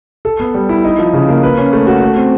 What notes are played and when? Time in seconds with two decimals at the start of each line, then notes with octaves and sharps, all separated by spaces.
0.25 A4
0.40 B3
0.54 G3
0.69 E4
0.84 D#4
0.99 F3
1.13 C#3
1.29 A#3
1.43 B4
1.58 C#4
1.73 A3
1.87 F#4
2.02 A3
2.17 C4